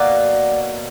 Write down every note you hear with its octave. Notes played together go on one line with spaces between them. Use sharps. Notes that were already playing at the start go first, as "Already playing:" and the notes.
Already playing: B2 F#3 A#3 D5